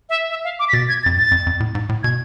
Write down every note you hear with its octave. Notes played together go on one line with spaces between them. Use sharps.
E5
E5
F5
D6
B6
B2 A6
G#6
A6
F2
G#2 A6
F2
F2
A2
G#2
A2
B2 G#6